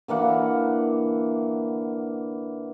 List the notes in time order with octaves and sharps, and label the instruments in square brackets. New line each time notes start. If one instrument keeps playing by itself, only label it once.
[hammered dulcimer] D3 E3 A#3 F#5